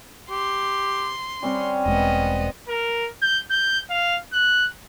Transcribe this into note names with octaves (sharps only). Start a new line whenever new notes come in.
G4 C6
G3 C4 C#4 F#5
E1 G#3 B3 D#5
A#4
G6
G6
F5
F#6